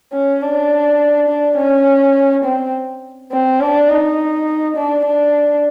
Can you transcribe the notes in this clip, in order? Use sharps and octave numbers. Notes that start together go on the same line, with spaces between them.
C#4
D4
D4
C#4
C4
C4
D4
D#4
D4
D4